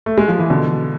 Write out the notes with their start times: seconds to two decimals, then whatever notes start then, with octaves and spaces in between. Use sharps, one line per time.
0.06 A3
0.18 G#3
0.28 F3
0.39 E3
0.50 B2 D3